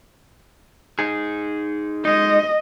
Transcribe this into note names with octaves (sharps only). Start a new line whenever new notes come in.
D#4 G#4
G#3 D#4 D#5